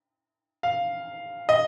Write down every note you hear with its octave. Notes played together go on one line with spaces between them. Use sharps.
F5
D#5